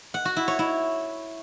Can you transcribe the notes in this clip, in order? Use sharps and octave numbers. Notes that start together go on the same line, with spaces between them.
F#5
F#4
E4
C#5
E4